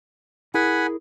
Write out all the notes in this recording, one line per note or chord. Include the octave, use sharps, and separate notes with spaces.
E4 G#4 A#4 F#5 G#5 B5